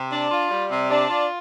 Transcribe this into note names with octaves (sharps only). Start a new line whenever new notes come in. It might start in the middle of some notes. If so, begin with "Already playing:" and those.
Already playing: C3
D4
F4
G3
C3
D4
F4